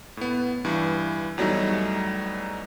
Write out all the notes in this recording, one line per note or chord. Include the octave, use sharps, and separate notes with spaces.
A2 B3
G2 E3
E2 F#3 G3 A3 D#4